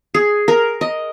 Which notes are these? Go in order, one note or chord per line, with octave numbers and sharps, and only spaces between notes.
G#4
A#4
D#5